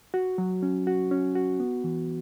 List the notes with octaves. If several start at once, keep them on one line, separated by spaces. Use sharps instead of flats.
F#4
F#3
C#4
F#4
C#4
F#4
B3
E3